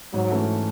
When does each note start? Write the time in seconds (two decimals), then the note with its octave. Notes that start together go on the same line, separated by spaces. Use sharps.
0.14 G#2 F#3
0.30 E3 A3 C#4 E4